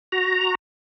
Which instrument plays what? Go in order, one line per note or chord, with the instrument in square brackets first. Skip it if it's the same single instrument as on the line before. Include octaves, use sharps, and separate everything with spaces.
[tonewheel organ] F#4 A#5